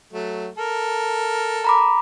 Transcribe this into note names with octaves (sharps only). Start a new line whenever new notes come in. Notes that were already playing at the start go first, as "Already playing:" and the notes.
F#3 A3
A4 A#4
A#5 B5 D6